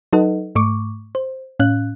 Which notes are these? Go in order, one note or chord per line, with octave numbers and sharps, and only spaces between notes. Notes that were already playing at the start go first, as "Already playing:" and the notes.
F#3 D#4 A4 B4 D#5 F#5
G#2 A3 C#6 D6
C5
A2 C#4 F5 F#6